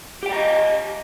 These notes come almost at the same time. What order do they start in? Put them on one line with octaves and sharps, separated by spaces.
G4 G5 D5 A#5 D#5